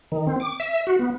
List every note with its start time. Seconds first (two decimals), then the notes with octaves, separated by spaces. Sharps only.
0.12 D#3
0.27 C4
0.40 D6
0.60 E5
0.87 F#4
0.99 B3